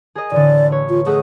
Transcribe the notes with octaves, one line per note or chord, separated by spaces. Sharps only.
G#4 A#4 D#5
A1 D3 D5
B4 C#5
F4
A3 G#4 D#5 F#5